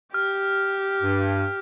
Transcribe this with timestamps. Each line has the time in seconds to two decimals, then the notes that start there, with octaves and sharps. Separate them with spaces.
0.14 G4 F6
1.02 G2